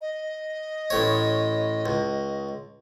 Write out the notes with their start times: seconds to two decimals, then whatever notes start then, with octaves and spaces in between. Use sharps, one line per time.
0.01 D#5
0.90 A1 A2 C#5
1.86 C#2